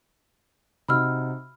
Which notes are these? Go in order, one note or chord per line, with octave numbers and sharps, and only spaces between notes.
C3 D#4 F#4 B5 E6 F6